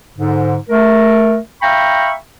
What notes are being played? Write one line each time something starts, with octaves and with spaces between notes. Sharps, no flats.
G#2 D3
A3 A#4
E5 F5 G5 A#5 B5 C#6